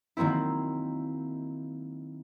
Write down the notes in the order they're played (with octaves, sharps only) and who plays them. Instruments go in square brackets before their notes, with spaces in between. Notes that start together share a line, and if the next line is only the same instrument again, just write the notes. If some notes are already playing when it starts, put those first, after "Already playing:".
[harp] D#3 F#3 A#3 C4 E4